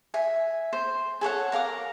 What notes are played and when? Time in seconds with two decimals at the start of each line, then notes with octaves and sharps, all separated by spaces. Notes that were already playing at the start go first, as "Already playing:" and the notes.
0.14 E5 G#5
0.73 C5
1.21 G#4 A4 C#5 F#5
1.52 A#4 F5 A#5 D6